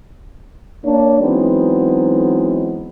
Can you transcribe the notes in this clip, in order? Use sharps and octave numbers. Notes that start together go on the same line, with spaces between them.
A#3 D4 C#5
E3 F#3 G#3 B3 C4 D#4